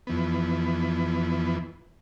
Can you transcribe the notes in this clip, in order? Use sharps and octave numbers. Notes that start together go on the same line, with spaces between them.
F2 E3 B3